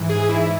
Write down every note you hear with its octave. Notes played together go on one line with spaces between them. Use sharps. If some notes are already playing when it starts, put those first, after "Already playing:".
Already playing: G#2 E3
G#4
E4